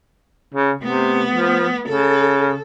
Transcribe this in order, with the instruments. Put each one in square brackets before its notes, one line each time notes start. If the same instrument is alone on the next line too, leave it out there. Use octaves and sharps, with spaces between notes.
[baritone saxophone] C#3
[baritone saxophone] C3 [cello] A3 B3
[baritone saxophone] F3
[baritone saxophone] C#3 [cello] A4